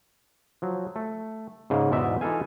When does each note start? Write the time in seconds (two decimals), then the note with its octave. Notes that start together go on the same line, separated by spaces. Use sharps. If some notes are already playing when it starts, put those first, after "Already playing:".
0.62 F3 F#3
0.96 A3
1.70 G#2 C#3 A#3
1.91 E2 G#2 B2 D#4 D5 E5
2.21 E3 D#4 F4 A4 F5 G#5